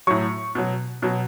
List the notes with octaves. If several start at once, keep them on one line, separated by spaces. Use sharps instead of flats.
A2 F#3 C#6
B2 F#3
B2 F#3